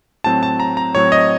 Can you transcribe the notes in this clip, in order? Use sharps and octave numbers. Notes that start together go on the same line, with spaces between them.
A2 F#3 C4 A5
A5
A#5
A#5
A2 F#3 C4 C#5
D#5